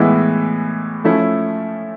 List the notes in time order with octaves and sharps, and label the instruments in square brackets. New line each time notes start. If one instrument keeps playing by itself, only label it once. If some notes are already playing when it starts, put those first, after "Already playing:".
Already playing: [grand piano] A2 E3 G#3 B3 E4
F3 A3 C#4 E4